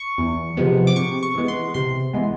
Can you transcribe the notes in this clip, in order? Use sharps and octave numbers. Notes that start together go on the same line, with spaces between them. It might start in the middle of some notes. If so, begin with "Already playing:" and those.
Already playing: C#6
E2
C3 F3 G#3 B3
D6
C3 C#6
C#6
E3 G#3 B3
C6
C3 C6
E3 G#3 B3